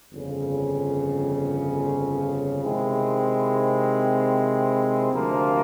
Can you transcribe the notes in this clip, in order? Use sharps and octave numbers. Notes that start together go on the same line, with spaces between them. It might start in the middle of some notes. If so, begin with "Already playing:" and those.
G1 F2 C#3
C3 D#3 G#3 C4 E4
D2 C3 F3 A#3